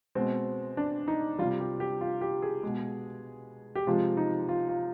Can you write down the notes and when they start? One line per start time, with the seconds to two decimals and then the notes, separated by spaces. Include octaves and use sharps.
0.15 B2 G#3 C4
0.77 D4
1.08 D#4
1.38 G3 F4
1.42 C3
1.60 G4
1.80 G4
2.01 F4
2.21 G4
2.42 G#4
2.63 B2 G#3
3.75 G4
3.87 C3 F3 G#3 F4
4.17 D#4
4.49 F4
4.69 F4